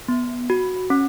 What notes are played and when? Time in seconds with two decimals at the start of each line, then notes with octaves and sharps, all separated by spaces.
0.08 B3
0.50 F#4
0.90 C#4